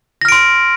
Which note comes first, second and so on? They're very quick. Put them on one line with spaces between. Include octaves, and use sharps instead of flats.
A#6 F6 D7 C6